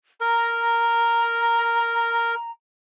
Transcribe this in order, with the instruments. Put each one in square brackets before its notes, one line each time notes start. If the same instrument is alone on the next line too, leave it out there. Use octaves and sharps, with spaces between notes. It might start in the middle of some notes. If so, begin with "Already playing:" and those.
[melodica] A#4 [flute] A#5